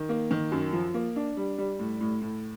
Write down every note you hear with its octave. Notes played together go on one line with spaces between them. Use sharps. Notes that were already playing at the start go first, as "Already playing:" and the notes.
Already playing: D#3
A#3
D#3
F#2
F3
A#3
D4
G3
G3
A2
A2
A2